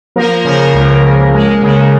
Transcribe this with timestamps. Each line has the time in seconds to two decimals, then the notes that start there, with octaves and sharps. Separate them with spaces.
0.16 F3 A#3 A#4
0.44 C#3 A#3 A#4
0.74 C#2
1.03 C#2
1.33 G#3
1.62 C#3